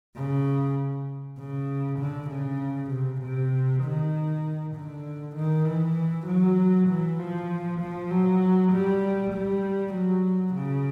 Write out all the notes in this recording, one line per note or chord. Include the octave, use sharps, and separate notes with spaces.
C#3
C#3
D3
C#3
C3
C3
D#3
D3
D#3
E3
F#3
E3
F3
F3
F#3
G3
G3
F#3
C#3